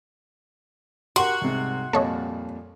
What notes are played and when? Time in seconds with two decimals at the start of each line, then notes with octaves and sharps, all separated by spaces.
1.16 F#4 G4 A#4 C6
1.41 C2 G#2 C3
1.93 F2 A#2 G3 A4 C#5 D#5